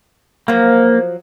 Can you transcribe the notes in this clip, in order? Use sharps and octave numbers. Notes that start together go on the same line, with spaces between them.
F3 F#3 A#3